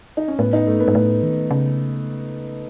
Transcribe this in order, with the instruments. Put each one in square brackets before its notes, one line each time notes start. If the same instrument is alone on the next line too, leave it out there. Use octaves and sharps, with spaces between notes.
[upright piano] D#4
C#4
[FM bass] A2 [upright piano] B3
[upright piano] D#4
[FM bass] G#2 [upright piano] A3
[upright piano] B3
[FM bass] G#2
A2
D#3
C#3